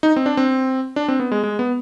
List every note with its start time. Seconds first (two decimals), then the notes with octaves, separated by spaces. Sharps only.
0.03 D#4
0.16 C4
0.26 D4
0.37 C4
0.96 D4
1.08 C4
1.20 B3
1.32 G#3
1.43 G#3
1.59 B3